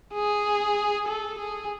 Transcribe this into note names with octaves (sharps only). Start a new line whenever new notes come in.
G#4
A4
G#4